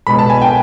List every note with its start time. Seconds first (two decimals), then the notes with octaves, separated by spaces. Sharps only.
0.07 B2 G#3 B5
0.19 A5
0.30 G#5
0.42 G5